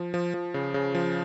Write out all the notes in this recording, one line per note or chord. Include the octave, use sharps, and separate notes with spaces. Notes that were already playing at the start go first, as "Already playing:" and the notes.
Already playing: F3
F3
F3
C#3
C#3
F3